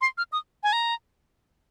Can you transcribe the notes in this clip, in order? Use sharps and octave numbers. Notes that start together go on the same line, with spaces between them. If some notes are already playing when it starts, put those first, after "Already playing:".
C6
F6
D#6
G#5
A#5